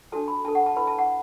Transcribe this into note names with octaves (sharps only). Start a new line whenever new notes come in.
D4 F#4 A4 A5
B5
D4 A4 A5
F#5
A5
E4 B4 B5
A5
F#5